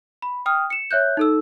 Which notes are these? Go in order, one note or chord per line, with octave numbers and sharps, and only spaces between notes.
B5
G5 D#6 F6
C#7 E7
C#5 E5 F#6 G6
D#4 A4 E6